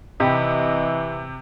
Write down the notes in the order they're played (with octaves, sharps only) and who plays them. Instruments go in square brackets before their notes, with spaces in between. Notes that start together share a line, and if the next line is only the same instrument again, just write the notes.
[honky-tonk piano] C3 [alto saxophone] E3 [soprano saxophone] D#5 [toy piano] F5 G5 B5